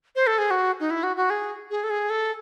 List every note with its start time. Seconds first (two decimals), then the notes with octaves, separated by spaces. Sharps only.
0.16 C5
0.27 A4
0.38 G#4
0.51 F#4
0.80 D#4
0.90 E4
1.03 F#4
1.16 F#4
1.30 G#4
1.70 G#4
1.84 A4
1.90 G#4
2.10 A4